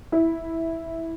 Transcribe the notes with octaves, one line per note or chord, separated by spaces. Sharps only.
E4